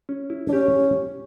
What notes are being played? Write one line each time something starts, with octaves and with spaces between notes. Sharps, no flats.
C#4
E4
D4
C#4 G4